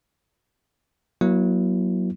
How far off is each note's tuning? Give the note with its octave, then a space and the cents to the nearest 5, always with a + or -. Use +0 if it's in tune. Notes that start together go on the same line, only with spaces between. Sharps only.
F#3 +0 A#3 +40 E4 +0